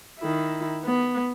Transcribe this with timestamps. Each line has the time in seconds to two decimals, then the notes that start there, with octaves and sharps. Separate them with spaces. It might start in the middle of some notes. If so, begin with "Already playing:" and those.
0.19 D#3 E4
0.84 B3